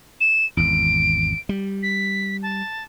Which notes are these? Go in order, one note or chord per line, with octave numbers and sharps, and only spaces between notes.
E7
G#1 E2 D7
G3
B6
A5